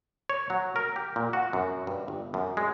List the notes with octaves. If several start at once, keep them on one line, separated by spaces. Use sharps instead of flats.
C#5
F#3
A#4
G4
A#2
F#4
F#2
G2
G1
F#2
G#3